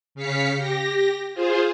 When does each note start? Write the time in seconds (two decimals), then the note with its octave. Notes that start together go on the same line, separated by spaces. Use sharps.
0.15 C#3 F5 B6 C#7
0.56 G4 A#6
1.34 F4 G#4 C5